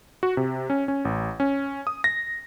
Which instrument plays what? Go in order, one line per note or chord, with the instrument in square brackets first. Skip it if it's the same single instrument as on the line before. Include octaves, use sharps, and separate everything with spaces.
[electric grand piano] F#4
C3
C#4
C#4
A1
C#4
D#6
A#6